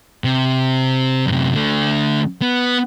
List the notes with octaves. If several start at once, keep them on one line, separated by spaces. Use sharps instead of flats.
C3
F#2 C3
D3 A3
B3